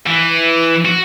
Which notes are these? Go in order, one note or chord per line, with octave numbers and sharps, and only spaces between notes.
E3
F#4